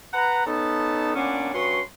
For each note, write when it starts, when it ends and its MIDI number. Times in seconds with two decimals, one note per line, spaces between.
0.14 0.45 71
0.14 0.45 78
0.14 0.45 82
0.46 1.11 59
0.46 1.11 61
0.46 1.11 63
0.46 1.11 69
0.46 1.11 81
1.16 1.50 46
1.16 1.50 59
1.16 1.50 61
1.16 1.50 62
1.54 1.80 43
1.54 1.80 61
1.54 1.80 66
1.54 1.80 71
1.54 1.80 84